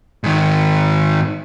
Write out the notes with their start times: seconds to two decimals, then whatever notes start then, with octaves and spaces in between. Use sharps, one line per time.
0.24 G#2 D#3